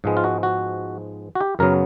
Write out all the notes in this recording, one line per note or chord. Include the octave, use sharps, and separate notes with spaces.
G#2 F3 G#3 B3
F4
F#4
F#4
F#4
G4
F#2 C#3 F#3 B3 A#4